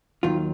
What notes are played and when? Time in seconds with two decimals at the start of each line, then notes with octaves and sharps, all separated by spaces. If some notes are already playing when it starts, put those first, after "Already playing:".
0.23 D#2 D#3 F#3 F4